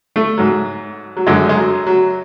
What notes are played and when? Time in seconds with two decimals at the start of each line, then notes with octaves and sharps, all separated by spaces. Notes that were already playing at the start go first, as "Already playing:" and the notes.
0.16 A3
0.38 G#2 F#3
1.17 F#3
1.27 F#2 D3 F#3 G#3
1.49 G#3
1.57 F#3
1.86 F#3